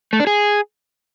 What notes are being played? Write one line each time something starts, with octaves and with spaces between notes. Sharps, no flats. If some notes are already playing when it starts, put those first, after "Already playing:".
A3
D4
G#4